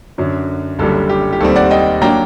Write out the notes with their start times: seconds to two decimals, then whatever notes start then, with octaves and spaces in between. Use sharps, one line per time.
0.18 F#2 D3 F#3
0.79 F#1 F#2 D3 G3 A4
1.09 G4
1.33 G4
1.40 D#2 D#3 G3 C4 A4
1.56 D5 F#5
1.71 D#5 G5
2.02 F#3 A#3 D4 G5 A#5